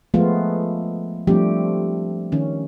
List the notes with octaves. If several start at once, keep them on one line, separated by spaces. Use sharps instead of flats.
F3 G#3 A3 B3 F4
F3 G3 A3 C4 D4 G4
D#3 C#4